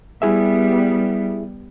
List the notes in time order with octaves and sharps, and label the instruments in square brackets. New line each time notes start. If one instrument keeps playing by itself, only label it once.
[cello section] G3 B3 [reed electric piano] E4 G#4 E5